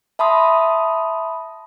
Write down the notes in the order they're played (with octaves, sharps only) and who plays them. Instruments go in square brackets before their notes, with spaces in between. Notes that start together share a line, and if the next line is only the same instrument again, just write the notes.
[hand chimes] E5 A5 B5 C6 D#6